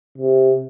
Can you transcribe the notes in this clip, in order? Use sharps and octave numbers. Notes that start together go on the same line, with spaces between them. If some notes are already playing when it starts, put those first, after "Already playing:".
C3